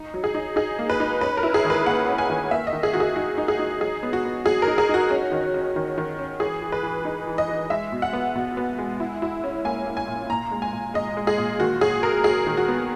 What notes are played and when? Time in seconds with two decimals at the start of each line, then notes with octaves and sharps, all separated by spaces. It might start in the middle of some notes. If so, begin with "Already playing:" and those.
Already playing: D#4
0.14 F#3
0.24 G#4
0.35 D#4
0.56 D#4 G#4
0.79 A#3
0.90 B4
1.00 D#4
1.21 C#4 B4
1.37 A#4
1.43 E4
1.54 G#4
1.65 D#3
1.70 B4
1.86 A#3 F#5
2.08 C#4
2.18 G#5
2.30 D#3
2.51 A#3 E5
2.67 D#5
2.73 D#3
2.83 G#4
2.93 D#3 F#4
3.00 G#4
3.16 D#4 F#4
3.38 D#4
3.48 G#4
3.59 D#4
3.81 F#3 G#4
4.03 B3
4.13 F#4
4.25 B3
4.46 F#3 G#4
4.62 A#4
4.67 D#4
4.78 G#4
4.89 D#4 F#4
5.11 C#4
5.32 D#3
5.54 C#4
5.76 D#3
5.98 D#3
6.19 C#4
6.40 E3 G#4
6.62 E3
6.72 B4
6.83 E3
7.05 D#4
7.27 E3
7.38 D#5
7.48 E3
7.70 G#3 E5
7.92 B2
8.02 F#5
8.13 B3
8.35 B2
8.57 B3
8.78 G#3
9.00 E4
9.22 E4
9.44 C#4
9.65 A#3 G#5
9.86 A#3
9.97 G#5
10.08 A#2
10.30 A#2 A#5
10.52 G#3
10.62 G#5
10.73 A#2
10.94 G#3 D#5
11.17 G#3
11.27 G#4
11.38 A#2
11.59 D#3 F#4
11.81 F#3 G#4
12.02 F#3 A#4
12.24 F#3 G#4
12.47 D#3
12.57 F#4
12.68 B3